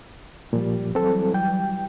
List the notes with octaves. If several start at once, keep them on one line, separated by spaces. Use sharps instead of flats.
A#2 F3 G3
E3 F#3 G3 C4 A4
G5